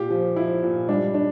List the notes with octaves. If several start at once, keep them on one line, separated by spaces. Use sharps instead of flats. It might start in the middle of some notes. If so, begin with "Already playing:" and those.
Already playing: A#2 G4
F3
F3 E4
A#2
G3 D4
D4